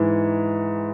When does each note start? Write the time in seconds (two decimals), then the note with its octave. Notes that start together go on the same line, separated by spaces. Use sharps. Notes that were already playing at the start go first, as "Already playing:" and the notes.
Already playing: G#2 E3